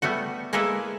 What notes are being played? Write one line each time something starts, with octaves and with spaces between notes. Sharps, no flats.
G3 A3 B3 F#4
G#3 A#3 E4 A4 B4 E5